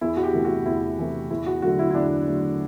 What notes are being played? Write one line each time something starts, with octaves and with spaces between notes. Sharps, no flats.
E2 E4
F#4
G4
C3 E3 A3
F#4
E2 E4
C3 E3 A3
E2 E4
F#4
D3 F#3 A3 F#4
E4
E4
E2 D4
D3 F#3 A3